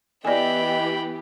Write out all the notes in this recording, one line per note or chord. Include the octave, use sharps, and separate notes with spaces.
E3 B3 G4 D5 D#5 G5 G#5 B5